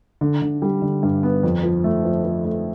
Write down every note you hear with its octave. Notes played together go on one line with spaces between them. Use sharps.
D3
D3
G3
D3
G2
B3
F2
F3
A3
F3
F3
A3